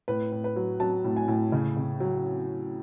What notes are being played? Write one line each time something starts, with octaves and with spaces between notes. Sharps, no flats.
A2 B4
A2
B4
F#3
F#3 A5
A2
G#5
A2
C#3
C#3
F#3